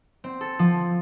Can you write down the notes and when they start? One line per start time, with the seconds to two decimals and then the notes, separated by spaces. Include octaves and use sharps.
0.24 C4
0.41 A4
0.59 F3